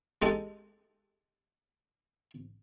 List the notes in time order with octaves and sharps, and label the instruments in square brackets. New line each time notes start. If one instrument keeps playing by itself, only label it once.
[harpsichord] G#3 D#4 G4 A4